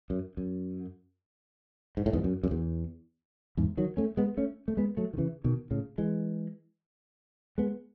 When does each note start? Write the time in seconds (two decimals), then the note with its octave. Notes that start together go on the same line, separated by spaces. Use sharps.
0.10 F#2
0.37 F#2
1.97 G#2
2.06 A2
2.13 E2 G#2
2.24 F#2
2.43 F#2
2.51 E2
3.57 E2 G#2
3.77 D#3 F#3
3.97 A3 C#4
4.17 G#3 B3
4.37 A3 C#4
4.68 A3
4.77 G#3 B3
4.97 F#3 A3
5.13 D#3
5.17 C#3 E3
5.44 B2 D#3
5.71 A2 C#3
5.98 E3 G#3
7.58 G#3 B3